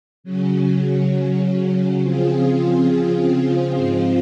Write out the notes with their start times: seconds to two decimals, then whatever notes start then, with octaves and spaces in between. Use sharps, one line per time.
0.24 C#3 F#3 C#4
2.00 C#3 F3 C4 F4 G#4
3.75 G#2 F3 G#3 C4 F4